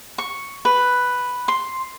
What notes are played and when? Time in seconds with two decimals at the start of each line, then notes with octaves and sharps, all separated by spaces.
0.18 C#6
0.65 B4
1.48 C6